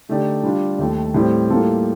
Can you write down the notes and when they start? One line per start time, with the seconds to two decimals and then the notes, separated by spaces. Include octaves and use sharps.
0.09 D3 A3 D#4 G4 D5
0.44 G3 D4 F4
0.78 D#2 D#3 A3
1.14 A2 G3 C4
1.50 A2 G3 A#3 F4 A4